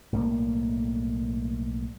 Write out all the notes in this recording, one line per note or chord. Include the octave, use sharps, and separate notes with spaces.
B1 A2 G3 A#3